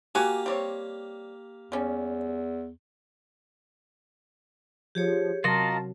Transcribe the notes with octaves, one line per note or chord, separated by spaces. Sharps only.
A#3 F#4 G4 G#5
G3 C4 C#5
E2 G3 C#4
F3 G4 G#4 C#5
C3 F#3 F4 F#4 A#4 D#5 A5 C6